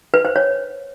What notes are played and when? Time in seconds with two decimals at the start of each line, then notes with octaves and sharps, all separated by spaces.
0.14 B4
0.25 C5
0.36 C#5